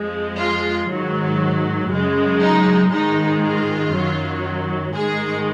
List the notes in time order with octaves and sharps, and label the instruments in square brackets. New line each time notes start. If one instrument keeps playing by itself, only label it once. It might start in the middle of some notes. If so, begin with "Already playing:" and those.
Already playing: [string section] F2 F3 G#3
F4
G#2 D#3 F#3
F#2 C#3 G#3
D#4
G#2 D#3 G#3 D#4
F4
F#2 D#3 F#3
G#2 D#3 G#3 G#4